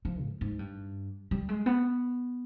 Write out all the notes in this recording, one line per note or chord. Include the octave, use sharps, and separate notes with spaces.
F3
G#2
G#2
G2
G3
G#3
B3